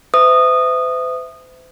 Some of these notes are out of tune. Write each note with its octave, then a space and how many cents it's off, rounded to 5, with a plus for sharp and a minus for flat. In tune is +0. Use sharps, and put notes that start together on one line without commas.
C5 -45 E5 +0 D#6 -15